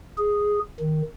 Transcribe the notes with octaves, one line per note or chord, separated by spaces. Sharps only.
G#4
D#3